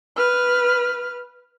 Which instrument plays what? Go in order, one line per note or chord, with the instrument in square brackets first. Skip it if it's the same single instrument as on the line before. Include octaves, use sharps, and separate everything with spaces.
[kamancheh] B4 F6